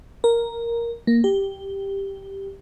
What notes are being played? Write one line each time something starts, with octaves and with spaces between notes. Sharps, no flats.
A#4
A#3
G4